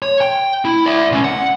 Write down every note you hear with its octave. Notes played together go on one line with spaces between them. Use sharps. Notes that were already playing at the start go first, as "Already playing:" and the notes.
C#5
G5
E4
D5 E5
C#2 C#3
F#5